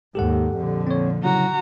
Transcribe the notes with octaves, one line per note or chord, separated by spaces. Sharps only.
D#2 G#2 G4 A4 F#5
F2 A#2 D3
C4 C#5
C#3 F#3 E4 F#4 A#5